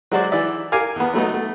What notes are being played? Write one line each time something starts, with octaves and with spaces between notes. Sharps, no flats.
F#3 G#3 F#4 C5 D5
E3 D5 E5
A#4 F5 G#5 D6
E2 B3
F#3 A3 B3 D#4
A3